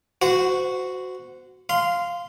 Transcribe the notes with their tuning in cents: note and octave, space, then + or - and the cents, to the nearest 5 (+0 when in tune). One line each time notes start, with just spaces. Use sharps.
F#4 +0 C5 -30 F#5 -15
F5 +0 C6 -15